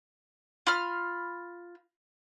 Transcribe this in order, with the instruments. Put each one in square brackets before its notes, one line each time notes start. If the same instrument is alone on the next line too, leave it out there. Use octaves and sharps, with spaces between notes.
[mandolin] F4 B5 F6